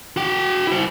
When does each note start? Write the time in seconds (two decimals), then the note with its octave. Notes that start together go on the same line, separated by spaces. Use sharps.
0.17 F#4 G5
0.67 E4 C5